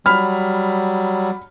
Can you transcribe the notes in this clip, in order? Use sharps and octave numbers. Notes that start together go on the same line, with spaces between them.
F#3 G3 B5 F6